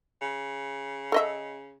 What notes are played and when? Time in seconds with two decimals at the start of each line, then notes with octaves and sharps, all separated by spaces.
0.22 C#3
1.12 A4 D#5 E5